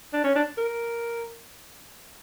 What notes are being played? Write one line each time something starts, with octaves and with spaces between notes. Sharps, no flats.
D4
C#4
D4
A#4